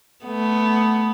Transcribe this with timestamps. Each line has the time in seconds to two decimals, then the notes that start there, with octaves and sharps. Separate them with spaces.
0.24 A3 B3